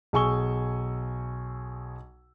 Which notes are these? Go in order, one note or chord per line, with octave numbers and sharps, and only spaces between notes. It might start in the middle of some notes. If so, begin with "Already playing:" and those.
B1 G#4 G#5 C#6 E6 G7